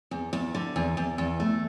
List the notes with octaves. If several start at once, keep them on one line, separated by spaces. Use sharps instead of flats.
E2
E2
D3
E2
E2
E2
A3